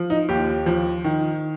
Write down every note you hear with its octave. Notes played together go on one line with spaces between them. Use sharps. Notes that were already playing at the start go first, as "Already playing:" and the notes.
Already playing: F3
D#4
D#2 G4
F3
D#3